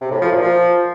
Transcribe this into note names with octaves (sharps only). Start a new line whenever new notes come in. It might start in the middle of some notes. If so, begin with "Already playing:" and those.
C3
A2
F3
A#2
F3